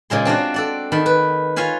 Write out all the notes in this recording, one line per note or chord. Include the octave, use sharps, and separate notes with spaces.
A#2 C#3 G#3 C6
C4 D4 F4 F#4
A4 D5 F#5
D#3 A5 B5
B4
F4 C#5 F5 G#5 B5